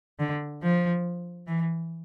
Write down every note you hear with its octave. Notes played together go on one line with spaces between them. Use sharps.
D3
F3
E3